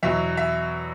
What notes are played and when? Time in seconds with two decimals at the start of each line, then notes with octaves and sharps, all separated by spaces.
0.03 E2 B2 F#3 E5
0.37 E5